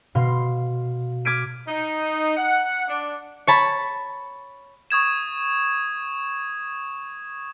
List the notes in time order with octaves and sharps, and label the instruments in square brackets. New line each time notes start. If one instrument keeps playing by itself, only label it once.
[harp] B2 F5 C6
D6 F6 G#6 B6 D7 D#7
[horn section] D#4
F#5
D4
[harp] C#5 A5 B5
[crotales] C#6 D#6 G#6 E7